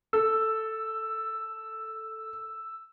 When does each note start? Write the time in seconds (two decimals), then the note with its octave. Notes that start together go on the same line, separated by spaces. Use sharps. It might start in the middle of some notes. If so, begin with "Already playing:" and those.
0.13 A4 E6